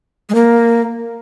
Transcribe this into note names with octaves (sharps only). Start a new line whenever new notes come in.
G#3
A#3